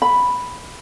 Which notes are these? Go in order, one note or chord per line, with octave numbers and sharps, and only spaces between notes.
B5